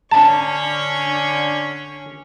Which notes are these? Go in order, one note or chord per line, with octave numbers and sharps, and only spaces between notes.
D3 C#4 A5 C#6